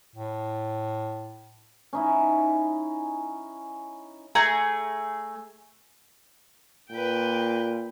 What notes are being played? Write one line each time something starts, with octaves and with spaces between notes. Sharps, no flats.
A2
C#4 D#4 E4
A3 G#4 A#5
A#2 B4 G5